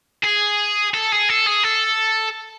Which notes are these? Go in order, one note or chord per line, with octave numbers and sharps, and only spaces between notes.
G#4
A4
G#4
A4
G#4
A4